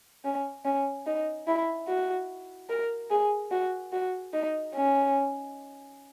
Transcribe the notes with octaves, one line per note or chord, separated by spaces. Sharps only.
C#4
C#4
D#4
E4
F#4
A#4
G#4
F#4
F#4
D#4
C#4